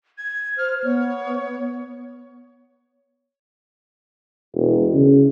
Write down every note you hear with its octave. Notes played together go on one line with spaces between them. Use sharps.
G#6
C5 F6
B3 C#5
E1
C#3